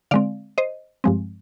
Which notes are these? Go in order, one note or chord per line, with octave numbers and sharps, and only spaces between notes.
D3 G#3 C4 D5 F5
C5 D#5
G2 F3 G#3 C4